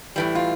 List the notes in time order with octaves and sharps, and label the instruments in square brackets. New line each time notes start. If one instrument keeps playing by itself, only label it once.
[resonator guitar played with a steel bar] A2 E3 G3
F4